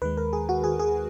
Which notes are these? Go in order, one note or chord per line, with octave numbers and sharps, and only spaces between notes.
D#2 D#3 G#3 B4
A#4
G#4
F#4
G#4
G#4